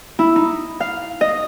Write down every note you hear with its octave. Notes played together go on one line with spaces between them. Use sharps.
E4
D#4
F5
D#5